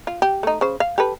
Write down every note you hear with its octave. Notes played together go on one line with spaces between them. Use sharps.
F4
G4
A3 D#4
C#3 C5
F5
G4 A4 B4